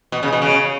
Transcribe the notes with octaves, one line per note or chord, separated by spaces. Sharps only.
B2
C#3
B2
C#3